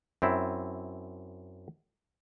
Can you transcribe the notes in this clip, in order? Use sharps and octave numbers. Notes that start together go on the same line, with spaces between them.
F#2 C4 E4